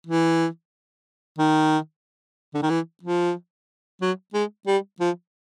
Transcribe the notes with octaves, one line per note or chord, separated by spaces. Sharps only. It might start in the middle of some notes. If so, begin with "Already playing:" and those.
E3
D#3
D3
D#3
E3
F3
F#3
G#3
G3
F3